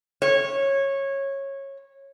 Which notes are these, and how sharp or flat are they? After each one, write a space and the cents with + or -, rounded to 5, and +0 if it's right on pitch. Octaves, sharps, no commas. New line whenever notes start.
C#5 -15